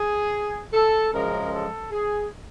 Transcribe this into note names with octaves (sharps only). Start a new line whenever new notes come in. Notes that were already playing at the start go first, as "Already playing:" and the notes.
Already playing: G#4
A4
F#2 C#3 F3 G#3 A#4
A4
G#4